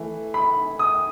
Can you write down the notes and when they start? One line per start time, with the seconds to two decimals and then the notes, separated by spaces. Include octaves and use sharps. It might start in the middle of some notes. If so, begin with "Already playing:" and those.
Already playing: E3 A3
0.34 B5
0.79 D#6